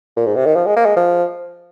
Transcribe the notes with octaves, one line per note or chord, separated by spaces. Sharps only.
A#2
G#2
C3
D#3
F3
G#3
A#3
G#3
F3